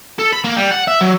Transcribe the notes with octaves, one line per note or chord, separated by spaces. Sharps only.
A4
B5
A#3
G3
F#5
E5
F#3